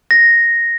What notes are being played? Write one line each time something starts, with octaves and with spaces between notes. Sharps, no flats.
A#6